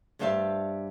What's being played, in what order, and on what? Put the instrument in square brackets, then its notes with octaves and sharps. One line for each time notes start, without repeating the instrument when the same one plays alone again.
[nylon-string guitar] G2 G3 C5 E5 F5 A5